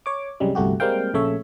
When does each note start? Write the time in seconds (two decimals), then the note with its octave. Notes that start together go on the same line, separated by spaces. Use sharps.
0.06 C#5 D6
0.40 C2 F#2 C#3 G3 G#3
0.55 G1 C2 A3 F#4 G4
0.80 G3 G#3 A#3 C4 F5 G5
1.14 A#1 C#3 A3 C#5 E5